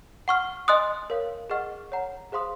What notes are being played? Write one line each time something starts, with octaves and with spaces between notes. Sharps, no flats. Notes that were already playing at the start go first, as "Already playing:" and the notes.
F#5 C#6 F6
D#5 G#5 C6 D#6 F#6
A#4 C#5 F5
G#4 D#5 F#5 C#6 F6
C#5 F#5 A#5
G#4 C5 F5 C6 D#6